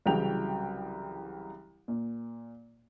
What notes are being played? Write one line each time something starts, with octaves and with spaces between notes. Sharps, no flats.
C2 C#3 E3 F#3 G5 F7
A#2